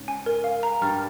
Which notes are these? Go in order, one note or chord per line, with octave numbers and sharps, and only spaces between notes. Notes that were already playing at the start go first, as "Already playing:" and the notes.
Already playing: G#2 C#3
G#5
A#4
F5
A#5
G2 G3 F6